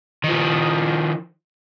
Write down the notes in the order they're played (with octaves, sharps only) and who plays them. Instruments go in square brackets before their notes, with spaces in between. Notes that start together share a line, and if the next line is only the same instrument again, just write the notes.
[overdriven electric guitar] D#3 F3